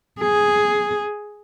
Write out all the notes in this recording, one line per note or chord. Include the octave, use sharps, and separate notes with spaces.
G#4